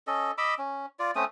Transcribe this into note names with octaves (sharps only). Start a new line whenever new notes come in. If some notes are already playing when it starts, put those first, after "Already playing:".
C#4 A4 D#5
D#5 B5 D6 E6
C#4
F4 D5
A3 C4 C#4 D#6